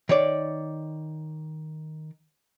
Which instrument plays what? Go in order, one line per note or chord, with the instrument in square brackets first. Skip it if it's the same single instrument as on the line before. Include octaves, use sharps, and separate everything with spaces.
[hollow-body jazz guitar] D#3 C#5 D5